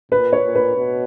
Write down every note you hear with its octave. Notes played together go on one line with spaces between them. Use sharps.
A#2 B4
C#5
A#2
B4
B2